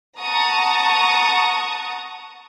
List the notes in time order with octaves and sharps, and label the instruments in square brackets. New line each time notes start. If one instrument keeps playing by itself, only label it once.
[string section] F#5 A5 A#5 C#6 D#6